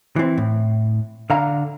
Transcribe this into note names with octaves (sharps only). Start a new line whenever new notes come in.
E3 C4
A2
D3 F5 A#5